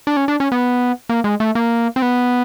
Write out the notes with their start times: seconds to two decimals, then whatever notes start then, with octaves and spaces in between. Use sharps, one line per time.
0.07 D4
0.17 C#4
0.28 D4
0.40 C#4
0.52 B3
1.09 A#3
1.24 G#3
1.40 A3
1.55 A#3
1.96 C4
2.02 B3